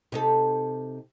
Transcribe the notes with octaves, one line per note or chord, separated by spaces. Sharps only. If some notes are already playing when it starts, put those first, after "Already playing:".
C3 D#4 A4